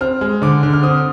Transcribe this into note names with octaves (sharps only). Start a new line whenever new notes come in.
C4 F6
G#3
D3 D6
D3
F6
C4 D#6